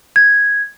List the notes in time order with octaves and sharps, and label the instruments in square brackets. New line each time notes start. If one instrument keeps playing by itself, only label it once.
[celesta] G#6